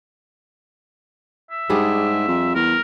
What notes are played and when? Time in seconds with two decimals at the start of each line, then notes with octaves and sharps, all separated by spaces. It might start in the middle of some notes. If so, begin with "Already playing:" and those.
1.51 E5
1.70 G#2 G3 D4 G#4
2.28 F2
2.55 E2 A#4